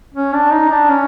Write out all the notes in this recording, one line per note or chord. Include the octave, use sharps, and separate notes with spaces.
C#4
D4
D#4
D4
C#4